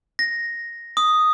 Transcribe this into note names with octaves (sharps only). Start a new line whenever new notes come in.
A#6
D#6